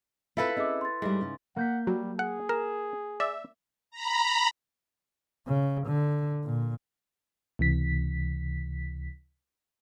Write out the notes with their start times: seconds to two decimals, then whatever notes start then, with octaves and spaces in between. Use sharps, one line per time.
0.37 C4 E4 F4 A4 B4 F5
0.56 C4 C#4 G#4 D#5 E5 D6
0.81 C6 A6
1.02 G#2 G3 A3 G#4
1.21 C#3 C#4
1.56 A#3 F#5 G6 B6
1.87 F#3 G3
2.19 G#4 F#5
2.49 A#4 E7
3.20 D5 E5
3.91 A#5 B5
5.47 C#3
5.87 D3
6.44 A#2
7.59 C#2 C3 E3 B6